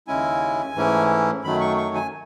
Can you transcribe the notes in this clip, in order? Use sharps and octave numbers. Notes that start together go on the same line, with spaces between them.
D#2 C#3 G#3 C#4 E4 G#5
G#2 E3 A3 C#4 E4
F#2 D#3 F#3 A3 B5
C#6
C#6
G#5